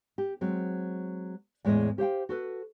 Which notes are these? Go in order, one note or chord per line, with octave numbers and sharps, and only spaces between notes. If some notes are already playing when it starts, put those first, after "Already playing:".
G4
F#3 G#3 C4
E2 A2 G#3 E4 D#5
G4 C5 F5 G5
F#4 A4 B4